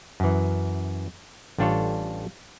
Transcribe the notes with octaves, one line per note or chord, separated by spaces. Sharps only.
F#2 E3
A1 G3 D4 F4 A4 C#5